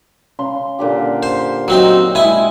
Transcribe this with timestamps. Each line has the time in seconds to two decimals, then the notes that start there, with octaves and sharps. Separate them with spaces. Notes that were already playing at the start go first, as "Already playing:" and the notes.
0.39 C#3 C6
0.79 A#2 D3 G4
1.23 C5
1.68 F#3 C4 D#4 F#5
2.15 G#3 E4 G#5